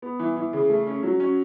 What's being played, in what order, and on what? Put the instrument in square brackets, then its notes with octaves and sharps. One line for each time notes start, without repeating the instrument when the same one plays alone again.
[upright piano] B3
E3
E3
C#3
A3
C#4
F#3
C#4